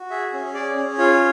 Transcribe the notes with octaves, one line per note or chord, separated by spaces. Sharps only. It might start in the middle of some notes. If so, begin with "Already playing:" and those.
Already playing: F#4
G#4 E5
C#4
G#4 D5
C#4
F4 C#5